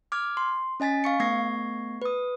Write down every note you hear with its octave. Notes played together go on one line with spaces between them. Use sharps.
D6 F6 G#6
C6
C#4 D#5 G#5 A6 B6
F5 C#6 C#7
A3 B3 C#6 G#6 A#6 C7
B4 D#6